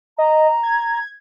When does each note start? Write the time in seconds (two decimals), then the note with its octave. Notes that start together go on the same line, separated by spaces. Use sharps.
0.18 D#5 A#5
0.63 G#6